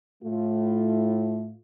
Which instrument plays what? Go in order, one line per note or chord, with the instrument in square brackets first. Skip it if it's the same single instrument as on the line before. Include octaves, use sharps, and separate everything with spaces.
[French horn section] A2 A3 F4